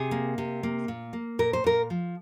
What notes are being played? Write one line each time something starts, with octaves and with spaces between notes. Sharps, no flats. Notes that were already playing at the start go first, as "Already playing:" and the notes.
Already playing: C3 G#4
A#3
C3
A#3
A#2
A#3
A#2 A#4
C5
A#2 A#4
F3